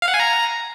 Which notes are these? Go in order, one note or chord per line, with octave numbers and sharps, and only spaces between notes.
F5
F#5
G#5
A#5